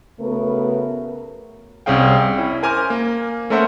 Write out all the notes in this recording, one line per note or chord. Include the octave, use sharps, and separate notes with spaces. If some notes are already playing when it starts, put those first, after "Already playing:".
C#3 A3 B3 F#4 A#4 B4
C2 C4 C#4 G#4 F5 G5
G5
C#4 E4
A#4 C5 G#5 A#5 D6 F6
A#3
A3 C#4 A#4 C5 E5 F#5